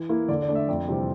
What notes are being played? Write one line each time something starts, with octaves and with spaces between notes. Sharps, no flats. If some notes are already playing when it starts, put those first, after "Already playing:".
Already playing: E3
A#3 E4
D3 D5
D5
A3 D4
E5
F2 D5
C3 E3 G3 C4